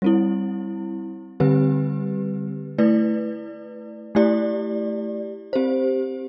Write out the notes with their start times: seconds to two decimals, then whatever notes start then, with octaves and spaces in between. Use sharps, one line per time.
0.02 G3 C4 E4
1.40 D3 G3 C4 G4 B4
2.78 A3 E4 B4 D5
4.15 A3 E4 G4 D5
5.53 C4 G4 C5